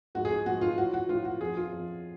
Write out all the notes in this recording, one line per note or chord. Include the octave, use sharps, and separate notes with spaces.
G#2 F3 F#4
G#4
G#4
G#2 F3 F#4
F4
A2 F3 F#4
F#4
A2 F3 F4
F#4
F2 F3 G#4
F4
F2 F3